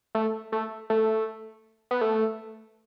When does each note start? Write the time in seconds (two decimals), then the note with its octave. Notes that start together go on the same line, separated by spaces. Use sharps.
0.15 A3
0.52 A3
0.90 A3
1.91 B3
2.01 A3